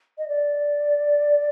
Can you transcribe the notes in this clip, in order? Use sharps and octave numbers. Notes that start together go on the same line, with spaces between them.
D#5
D5